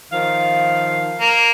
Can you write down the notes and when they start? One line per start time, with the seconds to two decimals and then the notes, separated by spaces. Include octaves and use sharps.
0.12 D#3 F3 F5
1.21 A#3